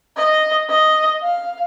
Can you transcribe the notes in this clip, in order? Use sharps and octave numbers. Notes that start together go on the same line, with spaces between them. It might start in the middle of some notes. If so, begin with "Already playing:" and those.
D#5
D#5
F5